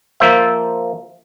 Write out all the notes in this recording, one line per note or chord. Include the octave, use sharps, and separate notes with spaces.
F3 A#3 C5 E5